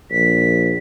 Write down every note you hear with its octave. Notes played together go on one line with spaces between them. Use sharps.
A#1 B6